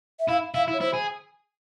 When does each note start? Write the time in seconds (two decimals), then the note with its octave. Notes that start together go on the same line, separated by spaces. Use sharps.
0.19 E5
0.29 E4 F5
0.54 E4 F5
0.68 E4
0.73 C#5
0.80 E4 C5
0.93 G#4